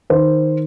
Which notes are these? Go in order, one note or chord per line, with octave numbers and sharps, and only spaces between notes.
D#3 C5